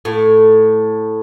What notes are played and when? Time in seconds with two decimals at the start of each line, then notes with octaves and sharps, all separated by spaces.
0.05 A2